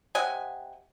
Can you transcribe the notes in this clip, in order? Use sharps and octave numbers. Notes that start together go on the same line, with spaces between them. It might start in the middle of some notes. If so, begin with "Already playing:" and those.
C3 D#5 F#5 G#5